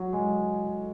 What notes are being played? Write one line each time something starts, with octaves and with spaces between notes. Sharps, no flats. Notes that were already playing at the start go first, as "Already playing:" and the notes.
Already playing: F#3
G#3